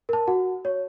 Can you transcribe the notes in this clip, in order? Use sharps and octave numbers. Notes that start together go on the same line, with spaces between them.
A#4 A5
F#4 F#5
C#5